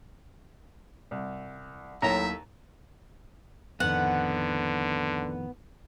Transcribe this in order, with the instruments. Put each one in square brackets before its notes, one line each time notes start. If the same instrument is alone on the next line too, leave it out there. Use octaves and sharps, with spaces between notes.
[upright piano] C2
[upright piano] D#2 [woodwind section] A2 F#3 [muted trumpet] E5 [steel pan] A#5
[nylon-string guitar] F2 A2 D#3 [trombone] D3 [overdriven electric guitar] B3 [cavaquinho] F#5